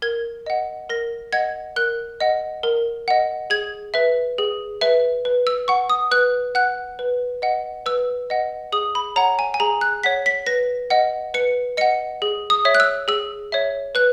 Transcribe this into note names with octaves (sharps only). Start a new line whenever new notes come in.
A#4 G#6
D#5 F#5
A#4 A#6
D#5 F#5 G#6
A#4 F#6
D#5 F#5
A#4
D#5 F#5
G#4 G#6
B4 E5
G#4
B4 E5
B4
E6
F#5 C#6
D#6
B4 F#6
F#5 F#6
B4
D#5 F#5
B4 E6
D#5 F#5
G#4 D#6
B5
C#5 F#5 A#5
G#5
G#5
G#4 A#5
F#6
C#5 F#5 B6
B6
B4 A#6
D#5 F#5
B4 C#7
D#5 F#5 C#7
G#4
D#6
C#5 E5
F#6
E6
G#4 E6
C#5 E5
B4 F#6